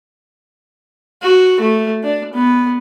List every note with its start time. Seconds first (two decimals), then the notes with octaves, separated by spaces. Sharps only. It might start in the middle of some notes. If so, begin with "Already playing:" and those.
1.22 F#4
1.60 A3
2.03 D4
2.33 B3